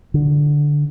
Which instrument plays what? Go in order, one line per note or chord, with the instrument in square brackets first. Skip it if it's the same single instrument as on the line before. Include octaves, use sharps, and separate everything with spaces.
[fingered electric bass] D3